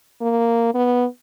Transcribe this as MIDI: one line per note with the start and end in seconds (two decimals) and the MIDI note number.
0.21 0.72 58
0.74 1.05 59